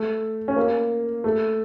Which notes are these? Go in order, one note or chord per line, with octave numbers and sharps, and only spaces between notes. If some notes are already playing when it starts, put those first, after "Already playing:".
Already playing: A3
C#4
A#3
A3